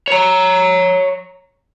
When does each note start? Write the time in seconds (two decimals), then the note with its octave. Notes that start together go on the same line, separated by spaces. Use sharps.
0.08 C#5 A#5